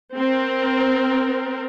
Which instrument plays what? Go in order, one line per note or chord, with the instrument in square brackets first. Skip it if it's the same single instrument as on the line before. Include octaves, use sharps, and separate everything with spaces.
[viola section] C4 A#4